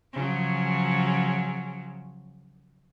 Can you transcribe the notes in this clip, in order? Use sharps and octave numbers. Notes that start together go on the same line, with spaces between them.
C#3 F3 F#3